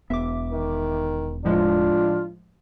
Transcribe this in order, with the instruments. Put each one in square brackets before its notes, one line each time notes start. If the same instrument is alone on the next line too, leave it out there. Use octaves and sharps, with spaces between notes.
[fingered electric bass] E1 B3 [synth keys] E5 D6
[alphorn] D#3
[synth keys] A2 F3 G#3 [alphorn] D4 [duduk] F4